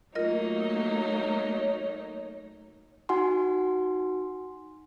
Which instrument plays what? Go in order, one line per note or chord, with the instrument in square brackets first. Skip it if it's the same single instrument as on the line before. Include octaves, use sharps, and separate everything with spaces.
[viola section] F#3 A#3 [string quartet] A3 D#4 [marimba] F4 A#4 D#5
[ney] C#5
[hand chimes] D#4 F#4 F#5 G#5 C6